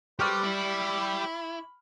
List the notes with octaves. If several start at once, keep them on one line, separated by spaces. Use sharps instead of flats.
G4 A4 B4 C5 D5 C#6 D6 F6
E4 B5